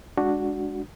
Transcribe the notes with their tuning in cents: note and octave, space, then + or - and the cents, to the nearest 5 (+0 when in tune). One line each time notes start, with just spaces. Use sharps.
G#3 +0 D4 +0 F#4 +0